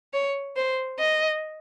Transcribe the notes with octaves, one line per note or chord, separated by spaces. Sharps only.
C#5
C5
D#5